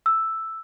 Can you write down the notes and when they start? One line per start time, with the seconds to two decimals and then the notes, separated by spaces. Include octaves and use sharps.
0.06 E6